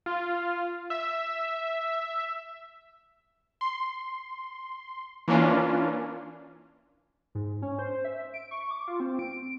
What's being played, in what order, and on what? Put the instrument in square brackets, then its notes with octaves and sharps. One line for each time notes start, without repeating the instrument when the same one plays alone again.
[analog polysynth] F4
E5
[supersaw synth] C6
E3 A#3 C#4 D4 F4
[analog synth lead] G#2
C#4
C5
E5
D7
C#6
D6
F4
C4
D7